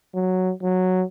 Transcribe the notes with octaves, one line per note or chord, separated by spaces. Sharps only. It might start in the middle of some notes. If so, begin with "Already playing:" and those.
F#3
F#3